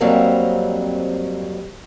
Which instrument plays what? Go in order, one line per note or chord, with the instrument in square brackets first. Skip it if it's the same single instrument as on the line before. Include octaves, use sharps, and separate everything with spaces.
[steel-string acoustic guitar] F2 F#3 G3 A#3 C4